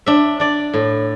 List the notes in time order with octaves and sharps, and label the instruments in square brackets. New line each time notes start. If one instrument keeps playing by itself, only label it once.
[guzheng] D4 E5
D4 D5
A2